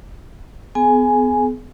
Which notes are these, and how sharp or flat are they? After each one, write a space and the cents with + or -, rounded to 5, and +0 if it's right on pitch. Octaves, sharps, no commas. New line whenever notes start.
B3 +35 G#4 +35 G#5 +0